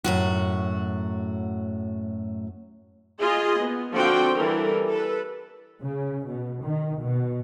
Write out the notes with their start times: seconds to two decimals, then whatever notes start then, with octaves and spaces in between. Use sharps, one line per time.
0.04 F#2 A2 F#4
3.19 F4 G#4 D#5
3.61 B3
3.93 D3 F3 C4 F#4 F5 G5
4.35 E3 G3 A4 A#4
4.89 A4 B4
5.82 C#3
6.28 B2
6.65 D#3
7.01 B2